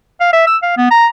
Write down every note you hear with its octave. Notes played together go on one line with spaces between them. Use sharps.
F5
E5
E6
F5
B3
A#5